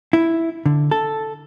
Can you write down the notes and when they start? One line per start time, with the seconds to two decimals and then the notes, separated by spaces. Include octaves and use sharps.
0.13 E4
0.66 D3
0.91 A4